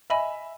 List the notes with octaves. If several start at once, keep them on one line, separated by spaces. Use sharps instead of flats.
D#5 E5 G#5 B5